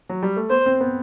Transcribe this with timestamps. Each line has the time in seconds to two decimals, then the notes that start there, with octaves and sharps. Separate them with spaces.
0.09 F#3
0.23 G3
0.36 A3
0.50 B3 C5
0.66 C4
0.81 B3